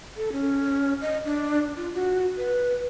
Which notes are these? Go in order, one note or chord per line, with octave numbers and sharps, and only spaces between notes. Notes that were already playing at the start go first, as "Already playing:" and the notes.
A4
C#4
D#5
D4
F4
F#4
B4